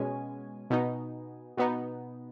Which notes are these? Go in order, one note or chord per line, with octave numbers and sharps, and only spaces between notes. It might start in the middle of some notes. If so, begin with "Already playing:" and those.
Already playing: B2 G#3 C#4 G#5
B2 B3 D#4
B2 B3 D#4